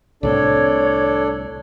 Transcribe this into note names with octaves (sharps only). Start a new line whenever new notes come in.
C2 A2 C4 D4 A4 C#5 D5